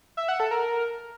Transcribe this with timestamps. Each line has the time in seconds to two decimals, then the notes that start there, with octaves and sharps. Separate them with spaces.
0.17 E5
0.28 F#5
0.40 A4
0.51 A#4